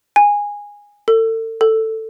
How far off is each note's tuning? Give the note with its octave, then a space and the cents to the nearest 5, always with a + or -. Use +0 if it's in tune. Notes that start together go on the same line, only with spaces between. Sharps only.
G#5 -15
A4 +40
A4 +10